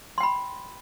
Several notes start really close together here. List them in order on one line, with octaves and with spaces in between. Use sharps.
C6 G5 B5